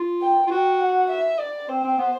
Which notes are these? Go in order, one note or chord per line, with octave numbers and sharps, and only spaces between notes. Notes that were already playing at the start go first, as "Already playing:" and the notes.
Already playing: F4
G5
F4
F#4 G5
F#5
E5
D5
C4 C5
C4
B3